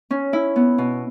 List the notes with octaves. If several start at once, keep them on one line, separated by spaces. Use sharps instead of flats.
C#4
E4
B3
B2